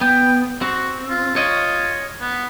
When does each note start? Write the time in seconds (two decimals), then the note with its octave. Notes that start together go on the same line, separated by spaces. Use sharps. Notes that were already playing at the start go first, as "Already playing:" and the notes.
0.01 B3 G5
0.62 C4 F#4
1.10 F4
1.36 F4 C#5 D#5
2.21 B3